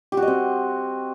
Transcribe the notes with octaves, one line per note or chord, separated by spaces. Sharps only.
G4
F#4
D#5
C4